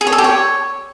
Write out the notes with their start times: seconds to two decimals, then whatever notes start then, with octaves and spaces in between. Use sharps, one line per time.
0.01 G#4
0.07 C#5
0.13 A4
0.18 G4
0.24 C#5